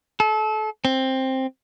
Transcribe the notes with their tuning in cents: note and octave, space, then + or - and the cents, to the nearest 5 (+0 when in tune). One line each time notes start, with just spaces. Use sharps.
A4 -30
C4 +10